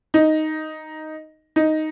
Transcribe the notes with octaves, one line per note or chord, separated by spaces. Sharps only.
D#4
D#4